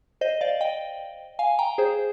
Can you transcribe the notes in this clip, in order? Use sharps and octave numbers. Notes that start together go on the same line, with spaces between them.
C5 D#5
D5 F5
D#5 G5
F5 G#5
G5 A#5
G#4 C5